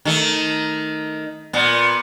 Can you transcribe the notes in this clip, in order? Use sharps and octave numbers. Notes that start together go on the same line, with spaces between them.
D#3 A3
A#2 B3